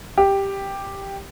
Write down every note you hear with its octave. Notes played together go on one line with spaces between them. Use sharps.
G4